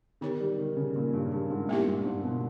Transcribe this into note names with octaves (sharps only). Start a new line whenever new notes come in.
D#3 B3 D#4 G4 C#5
G3
D#3
C#3
A#2
G2
G2
G#2
A#2 G3 B3 E4 G4
G#2
G2
G#2
B2